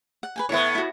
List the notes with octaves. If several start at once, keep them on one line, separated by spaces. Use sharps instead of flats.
F#5
B4 G5 G#5
A2 B3 E4 C#5 C#6
E4 F#4